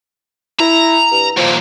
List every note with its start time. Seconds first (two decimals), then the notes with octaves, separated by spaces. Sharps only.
0.60 E4 A#5
1.12 G2
1.37 D#2 A#2 F3